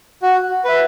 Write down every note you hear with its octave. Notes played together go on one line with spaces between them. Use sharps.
F#4
B4 E5